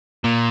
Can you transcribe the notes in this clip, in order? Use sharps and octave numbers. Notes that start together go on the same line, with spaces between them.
A#2 A#3